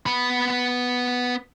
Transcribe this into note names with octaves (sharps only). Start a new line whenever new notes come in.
B3 B5